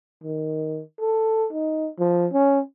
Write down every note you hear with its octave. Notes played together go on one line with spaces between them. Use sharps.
D#3
A4
D#4
F3
C#4